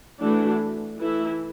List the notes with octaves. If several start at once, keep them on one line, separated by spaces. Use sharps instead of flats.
E3 A3 D4 F#4
E3 A3 E4